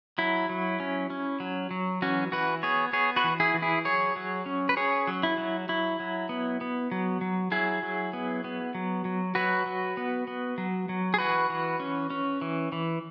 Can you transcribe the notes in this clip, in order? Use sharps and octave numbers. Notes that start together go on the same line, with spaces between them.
F#3 E4
F#3
C#4
C#4
F#3
F#3
E3 C#4 F#4
E3 F#4 B4
B3 G#4 C#5
B3 G#4 C#5
F#4 B4
E3
E4 G#4
E3
E4 G#4
F#3 G#4 C#5
F#3
C#4
B4
C#4 G#4 C#5
F#3
E4
F#3
F#3 E4
F#3
B3
B3
F#3
F#3
F#3 E4 G#4
F#3
B3
B3
F#3
F#3
F#3 F#4 B4
F#3
B3
B3
F#3
F#3
G#4
E3 F#4 B4
E3
C#4
C#4
E3
E3